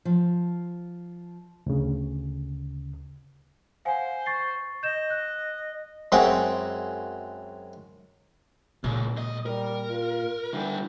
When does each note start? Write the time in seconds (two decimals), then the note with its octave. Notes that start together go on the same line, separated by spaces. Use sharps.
0.05 F3
1.66 D2 C#3
3.85 C5 F5 F#5 G#5
4.26 C#6 A6 C7
4.83 D#5 G6 E7
5.10 F#6
6.12 F#2 G#3 C4 E4 F#4 G5
8.84 C#2 A#2
9.16 B1 D#5
9.46 G3 A#4
9.90 F4
10.53 D3 E3 G3